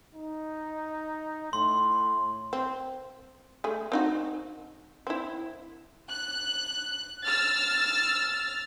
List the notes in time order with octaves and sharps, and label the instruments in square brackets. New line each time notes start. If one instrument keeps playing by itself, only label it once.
[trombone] D#4
[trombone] A2 [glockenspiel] C6
[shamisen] C4
A3 G#4
C4 D#4 F#4
C4 E4
[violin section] F#6
E6 F6 A6